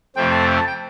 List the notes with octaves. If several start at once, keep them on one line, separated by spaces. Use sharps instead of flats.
F2 C3 A3 C4 G5
A5
G5
A5
G5